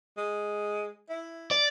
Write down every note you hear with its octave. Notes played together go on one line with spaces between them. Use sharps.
G#3
E4
D5